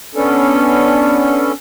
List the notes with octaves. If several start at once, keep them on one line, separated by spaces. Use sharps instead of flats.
B3 C#4 D4 A4